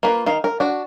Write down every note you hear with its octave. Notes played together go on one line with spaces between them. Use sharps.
A#3 F4 B4
D#3 F5
A#4
D4 F#4